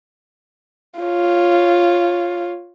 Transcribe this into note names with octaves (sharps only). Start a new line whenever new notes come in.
F4 C#5